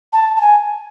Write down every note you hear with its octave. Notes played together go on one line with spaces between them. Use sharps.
A5
A5
G#5